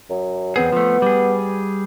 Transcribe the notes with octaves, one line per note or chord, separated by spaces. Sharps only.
F#2
E2 B3 C4 G#4
F3 A3
G3 G#4